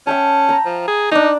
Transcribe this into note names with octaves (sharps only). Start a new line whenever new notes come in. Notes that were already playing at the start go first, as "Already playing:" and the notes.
C#4 E5 G5 A5
G5 A#5
F3
G#4
D4 D#4 D6